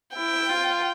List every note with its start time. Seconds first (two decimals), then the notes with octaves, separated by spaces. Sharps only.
0.16 E4 G5
0.49 F4